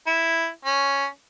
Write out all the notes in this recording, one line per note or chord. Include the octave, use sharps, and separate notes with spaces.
E4
C#4